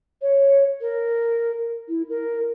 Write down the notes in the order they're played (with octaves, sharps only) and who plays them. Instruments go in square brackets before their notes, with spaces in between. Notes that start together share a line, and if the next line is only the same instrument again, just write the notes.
[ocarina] C#5
A#4
E4
A#4